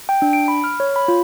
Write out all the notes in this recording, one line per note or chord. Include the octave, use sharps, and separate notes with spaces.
G5
D4
D7
B5
F6
C#5
B5
F4